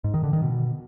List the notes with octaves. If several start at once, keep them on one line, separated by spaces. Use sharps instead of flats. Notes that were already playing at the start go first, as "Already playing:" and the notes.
G#2
D#3
D3
D#3
B2